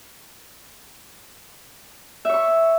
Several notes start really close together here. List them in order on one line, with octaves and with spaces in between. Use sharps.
E5 C#5 C#6